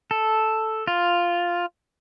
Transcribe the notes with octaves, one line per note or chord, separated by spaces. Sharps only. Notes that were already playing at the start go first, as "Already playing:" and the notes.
A4
F4